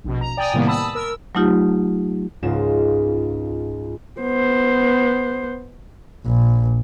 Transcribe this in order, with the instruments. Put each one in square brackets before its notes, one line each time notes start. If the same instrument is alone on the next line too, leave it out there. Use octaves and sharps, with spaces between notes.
[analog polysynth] A#1 B2
A#5
D5 G5 G#5 A#5 D#6
A2 C3 D#3 G3 A#3 B3
A5 B5 D#6 E6
A#4 E6
[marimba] F#3 A3 D#4 F4 G4
[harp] C#2 G#2 G#3 C#4 F4 E7
[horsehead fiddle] B3 C5
[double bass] A#1